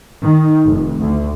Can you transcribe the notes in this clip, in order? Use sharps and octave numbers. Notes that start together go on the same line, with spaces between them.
D#3
F1
D2